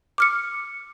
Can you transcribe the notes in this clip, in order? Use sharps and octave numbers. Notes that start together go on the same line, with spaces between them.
D6 F6 C#7